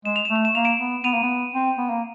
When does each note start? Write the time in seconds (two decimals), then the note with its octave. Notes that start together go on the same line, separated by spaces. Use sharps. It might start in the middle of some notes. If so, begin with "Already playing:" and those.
0.05 G#3 E7
0.16 F7
0.25 A3 E7
0.36 F7
0.45 E7
0.55 A#3 F7
0.64 D7 E7
0.79 B3
1.04 B3 D#7 F7
1.14 A#3
1.23 B3
1.54 C4
1.78 B3
1.90 A#3